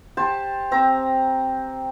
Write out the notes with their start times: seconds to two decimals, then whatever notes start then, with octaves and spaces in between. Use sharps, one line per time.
0.17 G4 C5 A5
0.71 C4 A#5